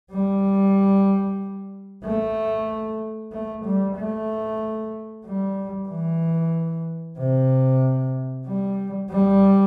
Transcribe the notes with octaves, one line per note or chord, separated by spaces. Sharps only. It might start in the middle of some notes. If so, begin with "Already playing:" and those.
G3
A3
A3
G3
A3
G3
E3
C3
G3
G3